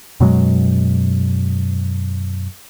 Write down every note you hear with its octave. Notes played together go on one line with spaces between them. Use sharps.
F#2 B2 F#3 G#3